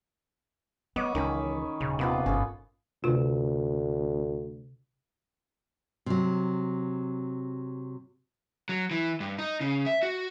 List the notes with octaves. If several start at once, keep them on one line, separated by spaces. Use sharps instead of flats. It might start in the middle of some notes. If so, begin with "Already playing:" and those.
G3 B3 C#5 D#5 D6
C#2 D#3 E3 C#4 B5
D#1 C#3
C3 A#3 B3 F4
G1 G#2 C#4 A4
D2 C3 F4
C3 F#3
F#3
E3
G2
D#4
C#3
E5
F#4